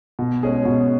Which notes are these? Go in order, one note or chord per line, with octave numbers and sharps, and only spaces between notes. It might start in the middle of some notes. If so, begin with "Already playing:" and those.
B2
G#3 C#4 G#4
B2